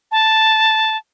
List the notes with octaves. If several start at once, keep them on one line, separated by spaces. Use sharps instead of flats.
A5